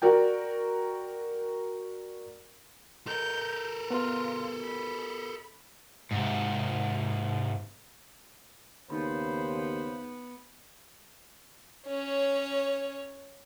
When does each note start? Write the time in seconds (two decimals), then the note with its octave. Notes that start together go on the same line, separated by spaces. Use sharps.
0.02 F#4 A#4 D5 G5
3.07 A4 A#4 G6
3.90 B3 F4
4.63 B5
6.11 G#2 C3
8.90 D#2 C#3 B3 D#4 C5 B5
11.87 C#4 C#5